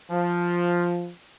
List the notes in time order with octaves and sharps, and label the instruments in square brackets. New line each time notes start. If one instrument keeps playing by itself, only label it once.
[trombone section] F3